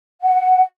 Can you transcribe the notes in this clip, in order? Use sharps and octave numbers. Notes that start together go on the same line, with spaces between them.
F#5